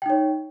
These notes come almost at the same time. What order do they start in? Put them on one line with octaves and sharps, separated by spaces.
G5 D#4 C#5